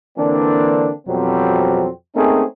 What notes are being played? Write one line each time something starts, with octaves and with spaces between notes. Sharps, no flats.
D3 E3 A#3 C4 D4
F2 B2 F#3 G3 C4
A3 A#3 C4 C#4 D#4 G#4